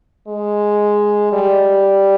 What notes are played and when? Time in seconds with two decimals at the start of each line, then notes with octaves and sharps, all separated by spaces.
0.28 G#3
1.33 G3